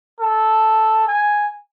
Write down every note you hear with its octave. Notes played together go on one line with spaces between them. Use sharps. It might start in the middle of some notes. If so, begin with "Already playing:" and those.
A4
G#5